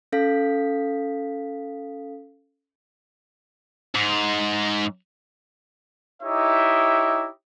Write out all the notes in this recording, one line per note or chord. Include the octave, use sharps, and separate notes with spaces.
C#4 A4 F5 B6
G#2
D#4 E4 G4 C#5 D#5 E5